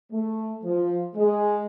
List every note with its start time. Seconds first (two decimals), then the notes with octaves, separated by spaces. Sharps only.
0.11 A3
0.64 F3
1.16 G#3